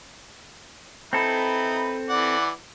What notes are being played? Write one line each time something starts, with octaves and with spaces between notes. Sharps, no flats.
C4 D#4 E4 A4 B4
E3 D5 F#5